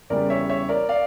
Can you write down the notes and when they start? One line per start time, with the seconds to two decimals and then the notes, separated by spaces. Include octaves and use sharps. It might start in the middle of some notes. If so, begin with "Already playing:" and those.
0.10 E2 C#3 E3 G3 A#4 D5
0.30 C#5 E5
0.49 C#5 E5
0.69 A#4 D5
0.89 D5 F5